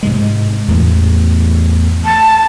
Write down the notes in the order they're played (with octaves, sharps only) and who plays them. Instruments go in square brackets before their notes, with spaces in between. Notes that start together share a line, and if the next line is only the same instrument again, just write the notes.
[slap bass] G#2 C3 G#3
E2 A2
[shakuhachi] A5